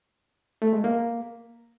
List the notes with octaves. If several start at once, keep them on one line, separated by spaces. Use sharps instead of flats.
A3
G#3
A#3